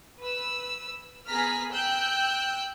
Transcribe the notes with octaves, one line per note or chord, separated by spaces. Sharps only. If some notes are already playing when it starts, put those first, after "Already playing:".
B4 E6
B3 G#4 A#5 F6 B6
G5 E6 F#6 G6